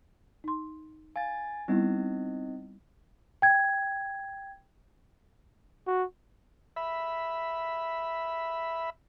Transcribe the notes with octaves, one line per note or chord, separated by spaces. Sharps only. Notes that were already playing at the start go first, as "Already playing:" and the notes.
D#4 C6
F5 G#5 A6
G3 B3 C4 D#4 E4 D#5
G5 G#6
F#4
E5 B5